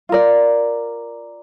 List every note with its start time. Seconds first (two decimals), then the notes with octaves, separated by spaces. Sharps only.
0.09 F4 A#4 D5